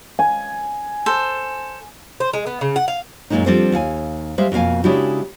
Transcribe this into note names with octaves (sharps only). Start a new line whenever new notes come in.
G#5
A4 C5
C5
G#3
B3
C#3
F#5
F5
F#2 A#2 D3 G#3 A#3 D#4
F3 G3 C4 D4 A4 C5
D#2 F5 F#5 G#5
G3 G#3 C5 E5 F5
F2 B2 A#3 F5 G#5
C#3 G#3 D4 E4 F#4 G4